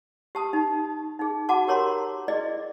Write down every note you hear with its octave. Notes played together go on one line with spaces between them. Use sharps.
G4 A5 D#6
D#4
D#4 G#4
F#4 F#5 A5 D6
G4 A#4 C#5 A#5 C6
E4 G#4 D5 D#5